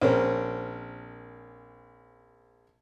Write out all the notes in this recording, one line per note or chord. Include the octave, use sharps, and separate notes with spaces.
A#1 C4 C#4 A#4